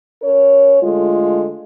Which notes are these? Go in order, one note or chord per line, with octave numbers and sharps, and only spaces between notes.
C#4 A#4 C#5
D3 G#3 A3 F4